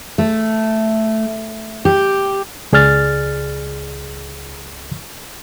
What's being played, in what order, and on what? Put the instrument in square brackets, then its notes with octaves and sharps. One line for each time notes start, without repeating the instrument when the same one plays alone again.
[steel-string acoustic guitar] A3
G4
[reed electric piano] C#2 G#4 D5 F6 A6